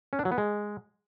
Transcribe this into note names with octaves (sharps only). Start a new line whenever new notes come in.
C#4
D4
F#3
B3
G#3